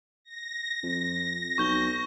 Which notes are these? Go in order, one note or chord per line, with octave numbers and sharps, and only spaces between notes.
A#6
F2
B1 C#6 G6 G7